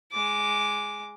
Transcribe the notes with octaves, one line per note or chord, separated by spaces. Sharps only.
G#3 D6